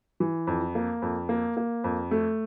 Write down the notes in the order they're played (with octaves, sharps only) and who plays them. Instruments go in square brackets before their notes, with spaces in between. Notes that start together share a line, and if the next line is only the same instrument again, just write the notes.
[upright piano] E3
F2
A#3
F2
A#3
A#3
F2
A3